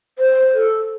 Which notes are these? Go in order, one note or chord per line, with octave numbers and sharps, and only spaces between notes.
C5
A4